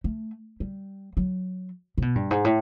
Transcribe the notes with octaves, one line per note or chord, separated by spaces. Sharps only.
A3
G3
F#3
C3
B2
G2
G#2
A2